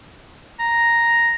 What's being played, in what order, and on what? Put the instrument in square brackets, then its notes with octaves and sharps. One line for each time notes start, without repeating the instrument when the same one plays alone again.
[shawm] A#5